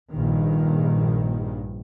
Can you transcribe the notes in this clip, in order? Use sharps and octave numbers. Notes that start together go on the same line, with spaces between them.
A#1 G2 D#3